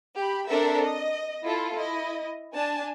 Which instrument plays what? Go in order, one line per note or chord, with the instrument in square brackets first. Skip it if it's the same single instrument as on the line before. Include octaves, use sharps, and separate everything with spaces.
[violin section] G4 B5
C4 D4 A4 A#4 E5
D#5
E4 F4 A4
E4 D#5
D4 G#5 A5